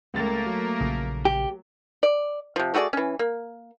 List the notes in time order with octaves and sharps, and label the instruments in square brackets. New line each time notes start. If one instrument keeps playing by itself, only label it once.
[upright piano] C#2 A6 [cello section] A3 A#3 A#4
[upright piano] F#3
[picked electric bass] A#1 C#3
[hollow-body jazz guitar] G4
[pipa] D5
C3 F3
A3 F#4 G#4 D5
E3 C#4
A#3